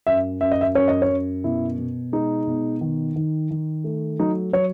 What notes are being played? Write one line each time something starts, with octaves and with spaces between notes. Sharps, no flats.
F#2 E5
F#2 E5
D#5
E5
F#2 C#5
D#5
C#5
F#2
B2 E4
B2
G#3 D#4
B2
D#3
D#3
D#3
A3
F#3 D#4
F#3 C#5